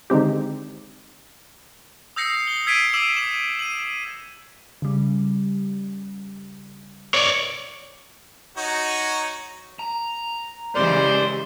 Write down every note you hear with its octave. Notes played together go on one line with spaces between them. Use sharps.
D3 D#3 G#3 C4 G4
D#6 E6 G6 A#6 C7 C#7
G7
E6 G#6 B6 C7 D7 D#7
D6 E6 E7 F#7
D6 E7 F#7
D#7 F#7
C#3 G3
C#5 D5
D#4 F#4 C#5
A#5
C#3 E3 G#3 G4 A#4 C5 D5